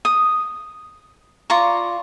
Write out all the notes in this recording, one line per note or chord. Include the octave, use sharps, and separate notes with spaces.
D#6
F4 D5 A#5 C#6